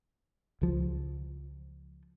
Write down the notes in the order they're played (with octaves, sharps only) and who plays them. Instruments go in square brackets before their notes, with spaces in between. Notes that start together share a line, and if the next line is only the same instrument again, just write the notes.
[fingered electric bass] C#2 F3